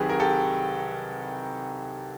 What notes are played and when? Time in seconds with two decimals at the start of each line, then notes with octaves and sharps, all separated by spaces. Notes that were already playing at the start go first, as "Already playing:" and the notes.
Already playing: C2 C3 D#3 F#3 G4 G#4 B4
0.09 A#4
0.20 G4 A4